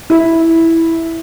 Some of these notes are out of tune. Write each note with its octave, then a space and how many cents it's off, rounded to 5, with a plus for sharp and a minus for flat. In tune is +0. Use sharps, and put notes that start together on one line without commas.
E4 -5